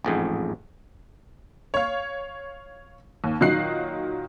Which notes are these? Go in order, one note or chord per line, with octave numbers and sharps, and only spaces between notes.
A1 F2 G#2
C#5 F5
D#2
A#2 D#3 F#3 D#5 F#6 C7